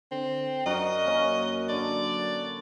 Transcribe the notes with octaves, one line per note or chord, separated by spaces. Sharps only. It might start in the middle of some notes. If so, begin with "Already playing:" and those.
D3 C4
F#2 F#4 A#4 D5 D#5
A#3 C#4 C#5
D3 D5